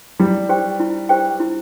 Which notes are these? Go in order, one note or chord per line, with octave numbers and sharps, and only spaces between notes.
G3 E4
G4 C5 G5
E4
G4 C5 G5
E4